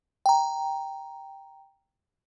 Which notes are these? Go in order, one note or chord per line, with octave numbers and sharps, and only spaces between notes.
G5 A#5